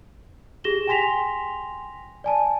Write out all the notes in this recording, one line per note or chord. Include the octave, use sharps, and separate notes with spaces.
G4 G#4 A#6 E7 G7
G5 G#5 C6 A#6 B6 F7
D5 G#5 A5